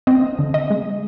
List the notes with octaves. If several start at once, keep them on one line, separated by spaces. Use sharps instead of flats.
C4 D#5
D3
D#5
G#3